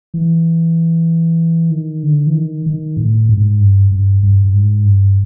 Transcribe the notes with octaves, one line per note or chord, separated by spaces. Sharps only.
E3
D#3
D3
E3
D#3
D#3
A2
G#2
G2
G2
G2
G2
G#2
G2